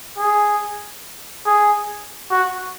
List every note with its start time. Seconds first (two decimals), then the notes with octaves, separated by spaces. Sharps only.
0.18 G#4
1.46 G#4
2.31 F#4